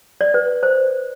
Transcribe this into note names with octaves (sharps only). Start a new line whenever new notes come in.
D5
B4
C5